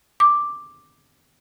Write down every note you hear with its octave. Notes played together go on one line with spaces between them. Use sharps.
D6